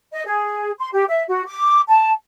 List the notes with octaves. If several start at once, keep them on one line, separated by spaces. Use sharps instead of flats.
D#5
G#4
C6
G4
E5
F#4
D6
A5